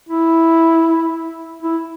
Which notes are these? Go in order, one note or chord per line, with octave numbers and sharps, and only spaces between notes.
E4
E4